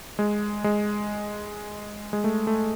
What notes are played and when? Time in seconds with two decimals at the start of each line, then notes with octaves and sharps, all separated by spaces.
0.19 G#3
0.64 G#3
2.13 G#3
2.24 A3
2.47 A3